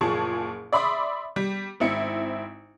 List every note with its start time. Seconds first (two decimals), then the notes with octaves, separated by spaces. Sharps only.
0.01 F#1 A#2 F3 G#4 A5 C#6
0.73 D5 E5 B5 C6 D6 D#6
1.36 G3
1.80 G#1 C4 E4 C#7